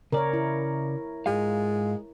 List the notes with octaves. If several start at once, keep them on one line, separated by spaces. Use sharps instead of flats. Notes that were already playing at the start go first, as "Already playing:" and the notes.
C#3 A#4 C#5 D5
E4
G#2 G#3 F4 F5